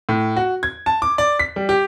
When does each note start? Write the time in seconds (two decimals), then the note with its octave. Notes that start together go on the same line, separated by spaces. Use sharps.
0.09 A2
0.36 F#4
0.63 G#6
0.86 A5
1.02 D6
1.18 D5
1.39 B6
1.56 G3
1.69 G4